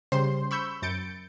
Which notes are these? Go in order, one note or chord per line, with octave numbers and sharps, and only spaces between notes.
C#3 G3 C5 C6 G6
B5 C#6 E6 G6
F#2 G6 A6 C#7 D7